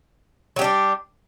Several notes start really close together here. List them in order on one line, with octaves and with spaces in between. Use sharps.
F#3 G4 D4 G3